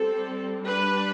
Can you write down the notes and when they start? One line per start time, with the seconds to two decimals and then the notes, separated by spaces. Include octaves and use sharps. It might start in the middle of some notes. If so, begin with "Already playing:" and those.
Already playing: G3 C4 A4
0.65 G3 D4 B4